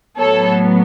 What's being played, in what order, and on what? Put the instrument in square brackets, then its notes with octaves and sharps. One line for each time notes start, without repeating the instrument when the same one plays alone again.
[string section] A2 F#3 B3 A4 C#5